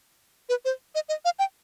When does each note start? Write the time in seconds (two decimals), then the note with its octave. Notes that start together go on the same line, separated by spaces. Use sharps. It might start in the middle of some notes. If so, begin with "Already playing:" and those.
0.49 B4
0.65 C5
0.95 D#5
1.09 D#5
1.25 F5
1.39 G5